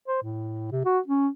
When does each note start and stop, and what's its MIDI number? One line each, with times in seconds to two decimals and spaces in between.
0.08 0.20 72
0.22 0.69 45
0.71 0.81 48
0.85 0.99 66
1.08 1.28 61